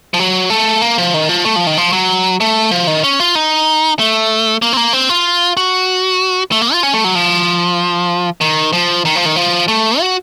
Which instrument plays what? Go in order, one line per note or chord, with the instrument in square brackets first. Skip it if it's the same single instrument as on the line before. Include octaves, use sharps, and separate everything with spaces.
[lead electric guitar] F3
F#3
A3
A#3
F3
D#3
F3
A3
F3
D#3
F3
F#3
A3
F3
D#3
C#4
F4
D#4
A3
A#3
C4
A#3
C4
F4
F#4
A3
A#3
F4
C#4
A3
F#3
F3
D#3
F3
D#3
F3
D#3
F3
A3
F#4